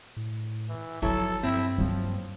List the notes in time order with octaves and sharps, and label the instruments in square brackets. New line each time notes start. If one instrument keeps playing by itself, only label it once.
[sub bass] A2
[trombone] E3
[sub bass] G1 [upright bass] F3 D#4 [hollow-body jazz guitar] F#3 E4 [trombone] A4
[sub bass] G2 [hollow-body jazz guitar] C4 [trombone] E4
[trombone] F3 [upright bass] F#3 A#3